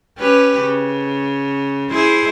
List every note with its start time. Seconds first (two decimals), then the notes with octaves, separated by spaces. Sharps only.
0.18 C#4 G4 B4
0.60 C#3
1.90 E4 G#4 C5